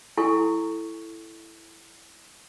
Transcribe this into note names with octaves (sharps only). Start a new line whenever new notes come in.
E4 A4 G#5 C#6